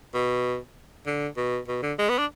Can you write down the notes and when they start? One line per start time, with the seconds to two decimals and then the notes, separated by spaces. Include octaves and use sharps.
0.14 B2
1.06 D3
1.37 B2
1.68 B2
1.83 D3
1.99 G#3
2.09 B3
2.19 D4